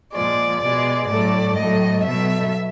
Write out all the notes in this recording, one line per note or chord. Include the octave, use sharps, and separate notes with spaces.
A#2 F3 G#3 D5
B2 G#3 D5
A2 F#3 A3 D5
A2 F#3 A3 D#5
B2 F#3 A3 E5